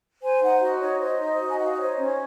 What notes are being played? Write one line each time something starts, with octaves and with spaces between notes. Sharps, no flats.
C5 G#5
D#4 F#5
F#4 D#5
D#4 C#5
C5 D#5
D#4
F#4
G#5
D#4 F#5
F5
D#5
C5 C#5
C#4